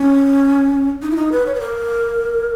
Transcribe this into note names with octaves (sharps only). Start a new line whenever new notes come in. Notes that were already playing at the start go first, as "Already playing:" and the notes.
Already playing: C#4
D#4
E4
D#4
B4
C#5
B4
A#4